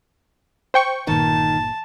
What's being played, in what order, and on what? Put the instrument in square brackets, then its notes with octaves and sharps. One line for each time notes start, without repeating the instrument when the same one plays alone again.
[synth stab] C5 G5 C#6
[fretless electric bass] G1 A#2 [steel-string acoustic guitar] D#3 [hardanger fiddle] A5